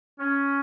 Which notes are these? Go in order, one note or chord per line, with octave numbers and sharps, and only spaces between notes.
C#4